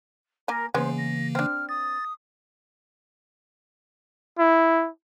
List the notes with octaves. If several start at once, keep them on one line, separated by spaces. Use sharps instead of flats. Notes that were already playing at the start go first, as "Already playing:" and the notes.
A#3 A#4 G#5
C#3 E3 G#3 A#3 B3 C#4 C5
A#6
C4 D4 F6
D#6 A6
E4